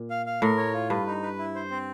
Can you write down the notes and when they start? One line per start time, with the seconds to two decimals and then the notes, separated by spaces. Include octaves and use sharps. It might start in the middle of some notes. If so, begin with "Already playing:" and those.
Already playing: A#2
0.10 F5
0.26 F5
0.42 A2 A#4
0.57 C#5
0.73 F4
0.90 G2 B4
1.06 D#4
1.23 B4
1.39 E4
1.55 C5
1.71 C4